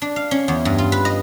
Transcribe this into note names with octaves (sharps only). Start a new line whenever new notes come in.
D4
F5
C#4
E2
G2
F4
B4
D#5